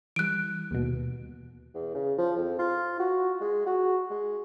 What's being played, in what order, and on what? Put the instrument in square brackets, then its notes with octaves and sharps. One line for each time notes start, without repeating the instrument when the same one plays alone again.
[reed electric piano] E3 G3 [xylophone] F#6 D7
[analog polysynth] D#2 B2
[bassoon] E2
C#3
F3
F2
F4
F#4
G#3
F#4
G#3